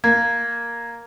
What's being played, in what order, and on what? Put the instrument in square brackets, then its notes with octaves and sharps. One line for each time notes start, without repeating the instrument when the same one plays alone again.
[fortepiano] A#3 [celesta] G#6